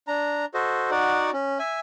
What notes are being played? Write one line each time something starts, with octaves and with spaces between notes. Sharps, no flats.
D4 A#5
F#4 A4 C5 D#5
D#4 F#4 D5 F#5
C#4
E5 G#5